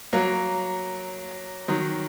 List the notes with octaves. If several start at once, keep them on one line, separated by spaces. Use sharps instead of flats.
F#3 A#3
D#3 F#3